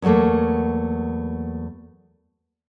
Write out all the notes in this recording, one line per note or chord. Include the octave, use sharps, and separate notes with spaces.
E2 F#3 G3 A3 A#3